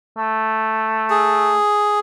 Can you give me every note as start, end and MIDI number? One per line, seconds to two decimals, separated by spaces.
0.17 1.57 57
1.10 2.00 68